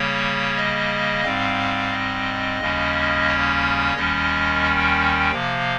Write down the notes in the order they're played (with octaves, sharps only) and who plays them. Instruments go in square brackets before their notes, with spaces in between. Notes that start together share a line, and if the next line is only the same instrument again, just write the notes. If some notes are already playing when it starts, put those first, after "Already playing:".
Already playing: [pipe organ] C#3 G3 A#3 C#5
D#5
G#2 G3 C4 F5
D#5
D#2 C#3 G3 A#3 C#4
C#5
D#2 D#3 G3 C#4 D#5
G5
C3 F3 A#3 F5